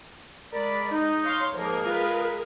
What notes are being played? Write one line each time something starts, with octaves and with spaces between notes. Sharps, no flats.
G#3 A#4 D5 B5
D#4
C#5 F5 C6
G#2 F3 G#3 A#3 G#4 A#4
F4 B4